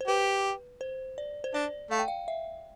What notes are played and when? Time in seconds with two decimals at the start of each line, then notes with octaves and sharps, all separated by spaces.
0.01 C5
0.07 G4 B4
0.81 C5
1.18 D5
1.44 C5
1.54 D4 D5
1.91 A3 F5
1.99 G5
2.08 F5
2.28 E5